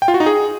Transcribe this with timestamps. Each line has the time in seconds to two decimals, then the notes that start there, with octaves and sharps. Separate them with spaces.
0.02 G5
0.08 F4
0.14 F#4
0.20 D#4
0.26 G#4